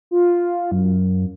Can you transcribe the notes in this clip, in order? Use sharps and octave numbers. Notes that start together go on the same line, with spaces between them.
F4
F#2